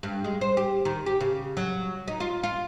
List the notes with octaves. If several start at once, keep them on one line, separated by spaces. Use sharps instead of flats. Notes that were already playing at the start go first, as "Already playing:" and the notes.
G2
G#3
C5
G4
D#3
G4
C#3
F#3
D#4
F4
F4